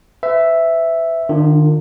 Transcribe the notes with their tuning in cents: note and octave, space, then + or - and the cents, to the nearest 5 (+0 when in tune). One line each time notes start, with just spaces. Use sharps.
B4 +45 E5 +0
D#3 -40 D4 +0 F4 -5